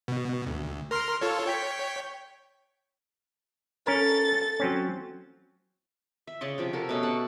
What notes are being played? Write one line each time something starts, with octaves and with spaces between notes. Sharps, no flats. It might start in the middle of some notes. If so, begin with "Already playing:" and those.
B2
D2
A#4 C6 F6
F4 A4 C#5
C#5 G5 B6
C#4 A4 A#4 A6
F#3 C4 C#4
E5
C#3 D5 D#5 C#6
C3 F3 G4
F#4 G4 A4 A#4
B2 A3 C#4
A4 D5 F#5 A5